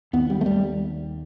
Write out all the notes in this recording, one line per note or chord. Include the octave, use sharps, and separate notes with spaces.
D#2 B3
G3
A3
G3